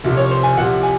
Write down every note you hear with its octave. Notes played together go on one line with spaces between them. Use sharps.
C2 C3 F3
C#5
C5
G#5
C2 C3 F3 F#5
G#5